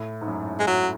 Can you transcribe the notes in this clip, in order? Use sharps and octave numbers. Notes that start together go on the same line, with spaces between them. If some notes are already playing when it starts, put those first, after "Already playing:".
Already playing: A2
G#2
F#2
G#3
F#3